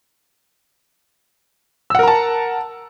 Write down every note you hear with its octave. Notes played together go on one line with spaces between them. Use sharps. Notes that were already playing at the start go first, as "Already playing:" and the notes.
A#4 F#5 A5 A#5 E6